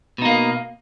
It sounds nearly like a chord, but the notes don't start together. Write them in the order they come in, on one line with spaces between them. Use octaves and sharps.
B2 D#4 A#3